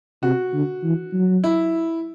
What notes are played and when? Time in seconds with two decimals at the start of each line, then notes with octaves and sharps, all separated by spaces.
0.23 C3 F#4
0.54 D3
0.84 E3
1.13 F#3
1.44 E4